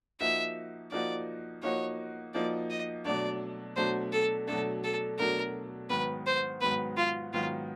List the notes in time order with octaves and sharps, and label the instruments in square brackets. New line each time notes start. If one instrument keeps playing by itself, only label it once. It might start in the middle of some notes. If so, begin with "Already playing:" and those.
[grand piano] F3 A#3 D#4 F#4 [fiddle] E5
[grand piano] F3 A#3 D#4 F#4 [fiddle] D5
[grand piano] F3 A#3 D#4 F#4 [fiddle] C#5
[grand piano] F3 A#3 D#4 F#4 [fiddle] D5
[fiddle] D#5
[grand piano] B2 F#3 A3 D4 [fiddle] D5
[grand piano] B2 F#3 A3 D4 [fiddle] C5
[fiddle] A4
[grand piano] B2 F#3 A3 D4 [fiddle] A4
[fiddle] A4
[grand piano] B2 F#3 A3 D4 [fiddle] A#4
[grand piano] G#2 D#3 F#3 B3 [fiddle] B4
[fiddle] C5
[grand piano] G#2 D#3 F#3 B3 [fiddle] B4
[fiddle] F4
[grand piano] G#2 D#3 F#3 B3 [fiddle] F4